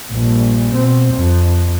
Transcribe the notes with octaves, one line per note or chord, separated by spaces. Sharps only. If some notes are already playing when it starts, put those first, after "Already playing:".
A#1 G2
B2 C4
F2